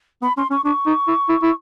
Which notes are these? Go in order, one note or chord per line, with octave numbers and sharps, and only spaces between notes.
B3 B5
C#4 C6
C#4 C#6
D4 C#6
D#4
E4
E4
E4